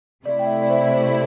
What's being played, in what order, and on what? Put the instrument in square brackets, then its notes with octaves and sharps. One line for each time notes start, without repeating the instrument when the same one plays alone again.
[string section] C3 A3 E4 [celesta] D5
[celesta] G5
E5
D5
C5
C5